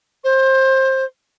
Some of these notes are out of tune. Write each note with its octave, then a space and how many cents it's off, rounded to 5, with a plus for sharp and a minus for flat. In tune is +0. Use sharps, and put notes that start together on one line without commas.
C5 +20